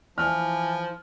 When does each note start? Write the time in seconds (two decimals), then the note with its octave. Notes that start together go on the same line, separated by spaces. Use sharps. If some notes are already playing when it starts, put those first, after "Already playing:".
0.18 E3 F3 E4 F6